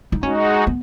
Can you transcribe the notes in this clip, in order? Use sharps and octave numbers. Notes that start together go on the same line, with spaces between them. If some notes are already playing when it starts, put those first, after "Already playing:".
D#4
G#3 C#4 D#4 F#4
B3